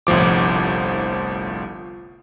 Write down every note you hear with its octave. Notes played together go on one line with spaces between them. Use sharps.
G1 C2 A2 F3 D6